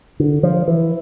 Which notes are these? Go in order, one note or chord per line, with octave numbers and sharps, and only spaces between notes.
D3
F3
E3